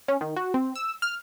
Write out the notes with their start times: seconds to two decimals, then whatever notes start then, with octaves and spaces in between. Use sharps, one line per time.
0.08 C#4
0.21 D#3
0.36 F#4
0.54 C4
0.76 E6
1.02 F6